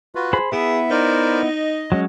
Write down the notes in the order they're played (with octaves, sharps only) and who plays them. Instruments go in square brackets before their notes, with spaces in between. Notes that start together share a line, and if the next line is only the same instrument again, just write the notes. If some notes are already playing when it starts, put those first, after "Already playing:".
[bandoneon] F4 F#4 B4
[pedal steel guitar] G#4 C5 B5
[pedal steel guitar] B3 E4 B4 [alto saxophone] G#4 [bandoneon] E5
[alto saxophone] D#4 [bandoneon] A#4 C5 D5
[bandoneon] D#5
[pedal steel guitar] F#3 G#3 C#4